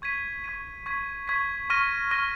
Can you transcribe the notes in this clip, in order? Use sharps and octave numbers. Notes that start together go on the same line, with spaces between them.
C#6 G#6 B6 D#7
C#6 G#6 B6 D#7
C#6 G#6 B6
C#6 G#6 B6
C#6 F6 A#6 D#7
C#6 F6 A#6 D#7